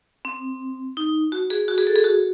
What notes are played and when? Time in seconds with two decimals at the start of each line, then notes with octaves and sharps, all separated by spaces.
0.25 C4
0.97 D#4
1.32 F#4
1.50 G#4
1.68 F#4
1.78 G#4
1.87 A4
1.95 G#4
2.04 F#4